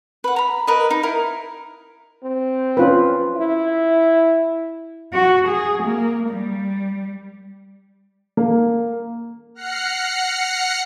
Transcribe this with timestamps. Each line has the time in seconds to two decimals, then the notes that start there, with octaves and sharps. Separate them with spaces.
0.24 B4 F#5
0.36 A#5 B5
0.67 A#4 B4 D#5
0.90 D#4
1.03 E4 A#4 D#5
2.24 C4
2.77 C#4 F4 B4
3.36 E4
5.13 F#4
5.48 G#4
5.83 A#3
6.30 G3
8.37 A#3
9.55 F#5 F6 F#6 A#6 C7 C#7